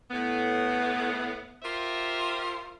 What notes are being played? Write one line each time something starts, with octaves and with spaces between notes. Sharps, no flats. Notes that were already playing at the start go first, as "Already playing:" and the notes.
A2 B3
F4 G4 A#4 C5 E5